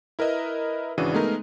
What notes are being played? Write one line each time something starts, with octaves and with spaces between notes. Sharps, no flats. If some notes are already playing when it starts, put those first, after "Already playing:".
E4 A#4 B4 D#5 E5
G#1 C#3 E3 D4 F#4 D#7
G#3 A3 B3 D#4 A#4